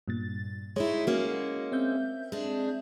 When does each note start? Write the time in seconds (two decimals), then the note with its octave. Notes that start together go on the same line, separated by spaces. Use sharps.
0.08 G2 A#2 A6
0.76 G#3 D#4 E4 C#5
1.07 G#3 A#3 C#4 F#4
1.72 C4 E5 G6
2.32 G#3 D4